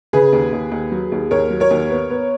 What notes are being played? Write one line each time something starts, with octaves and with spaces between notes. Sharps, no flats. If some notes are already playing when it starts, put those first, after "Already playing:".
C#3 G#4 B4
D#2
D#2
D#2
F#3
D#2
D#2 A#4 C#5
F#3
A#4 C#5
D#2
B3
B3